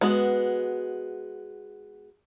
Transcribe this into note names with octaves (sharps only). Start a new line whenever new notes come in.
G#3 B3 F#4